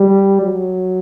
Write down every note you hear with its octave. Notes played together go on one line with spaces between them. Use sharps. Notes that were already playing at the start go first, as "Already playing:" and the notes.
Already playing: G3
F#3